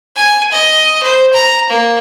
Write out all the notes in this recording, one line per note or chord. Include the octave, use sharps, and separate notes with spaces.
G#5
D#5
C5
A#5
A#3